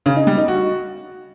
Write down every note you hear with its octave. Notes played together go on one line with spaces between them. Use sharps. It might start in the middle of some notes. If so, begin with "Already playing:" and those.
C#3
D#4
G3
D#4
F#4